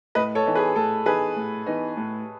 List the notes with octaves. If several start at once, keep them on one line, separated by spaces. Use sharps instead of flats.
A2 B4 D#5
A4 C#5
E3 B3 D#4
G#4 B4
A2 A4
E3 B3 D#4 G#4 B4
A2
E3 B3 D#4
A2